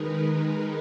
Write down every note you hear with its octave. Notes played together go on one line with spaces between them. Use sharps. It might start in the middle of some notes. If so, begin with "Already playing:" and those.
Already playing: D#3 G#3 D#4 A#4 B4
B4